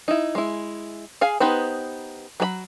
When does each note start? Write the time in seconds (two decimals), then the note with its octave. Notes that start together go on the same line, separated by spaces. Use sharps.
0.08 D#4 E4
0.35 G#3 E4
1.21 G#4 F5 G#5
1.40 B3 D#4 G4 B4 C5
2.40 F#3 G#4 B5